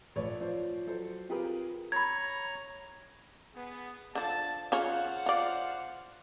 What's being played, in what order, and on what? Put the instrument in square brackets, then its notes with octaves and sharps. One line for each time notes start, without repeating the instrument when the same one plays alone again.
[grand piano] A#1 A3 B4 C#5 D5
F3 C5 D5
F#3 A4 C5
C4 F4 G4 G#4 A#4 B4
[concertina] C#5 A#5 [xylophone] B5 G#6
[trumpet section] B3 G#4
[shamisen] D3 F3 [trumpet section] A5
[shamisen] C#3 F4 C#5 [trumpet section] C5 F5 F#5
[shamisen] F4 D5